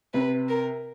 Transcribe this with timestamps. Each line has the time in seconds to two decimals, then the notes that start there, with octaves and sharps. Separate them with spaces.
0.14 C3 B4
0.49 A#4